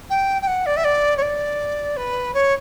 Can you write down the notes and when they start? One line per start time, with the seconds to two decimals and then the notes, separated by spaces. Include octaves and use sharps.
0.10 G5
0.42 G5
0.47 F#5
0.66 D5
0.77 E5
0.84 D5
1.17 C#5
1.22 D5
1.96 B4
2.34 C#5